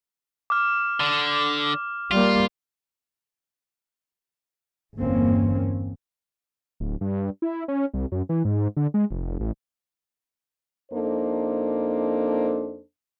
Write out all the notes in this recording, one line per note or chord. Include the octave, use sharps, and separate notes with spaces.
D6 F6
D3
G3 A#3 F4
G1 E2 G2 A#3 C4 C#4
D1
G2
E4
C#4
C2
F#2
E3
G#2
D3
G#3
F1
A1
F2 A#3 D4 D#4 A4 C5